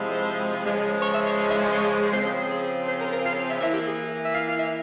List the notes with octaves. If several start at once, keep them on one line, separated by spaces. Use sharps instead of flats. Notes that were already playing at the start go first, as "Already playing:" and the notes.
Already playing: C3 F3 G#3 E4
C5
C#3 F3 G#3
C#5
E5
C#5
E5
C#5
C5
C#5
C#3 F3 C4 C5
G#4
G#4
G#4
C5
A#4
A#4
F5
E5
E3 A#3 E4 E5
G4
G#4
E5
F5
F5
E5